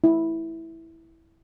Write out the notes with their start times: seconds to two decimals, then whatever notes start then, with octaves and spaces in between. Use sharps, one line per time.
0.04 E4